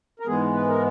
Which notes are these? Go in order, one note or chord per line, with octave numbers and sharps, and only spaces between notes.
A#4
G#2 E3 G#3 B3 G#4
B4
A#4